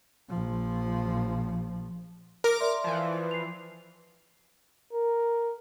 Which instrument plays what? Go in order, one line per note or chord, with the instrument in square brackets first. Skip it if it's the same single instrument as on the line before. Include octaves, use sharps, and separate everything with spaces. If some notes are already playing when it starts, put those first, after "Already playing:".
[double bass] A#1 F3
[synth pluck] A#4 [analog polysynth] D6 F6 A#6
[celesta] D5 E5 C6
[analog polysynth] E3 F3
[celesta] C7 F7
[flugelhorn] A#4